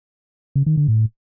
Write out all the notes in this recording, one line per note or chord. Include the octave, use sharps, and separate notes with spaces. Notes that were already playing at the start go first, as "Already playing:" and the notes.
C#3
D#3
D3
A2